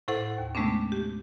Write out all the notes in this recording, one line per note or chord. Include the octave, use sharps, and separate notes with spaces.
A2 E4 A4 C5 F#5
D#2
C3 G#3 A3 B3 C#4 D4
G4